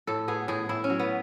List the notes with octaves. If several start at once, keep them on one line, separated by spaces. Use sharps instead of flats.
A2 A4
B3 G#4
A2 G#4
A2 E4
C#4
F#3
B3